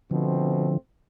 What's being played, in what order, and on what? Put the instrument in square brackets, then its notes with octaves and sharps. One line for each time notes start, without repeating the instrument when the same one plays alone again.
[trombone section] B2 A3 C4 [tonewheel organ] D3 F3